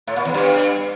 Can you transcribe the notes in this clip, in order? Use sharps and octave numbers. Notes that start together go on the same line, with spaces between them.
A2
A#2
E2
G2